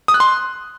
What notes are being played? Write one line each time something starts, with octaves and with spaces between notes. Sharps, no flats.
D#6
F#6
C6